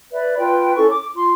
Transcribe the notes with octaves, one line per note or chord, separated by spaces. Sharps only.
B4 D5 E5
F4 B4 G5
C#4 E4 A4 C#6
D6
F4 C6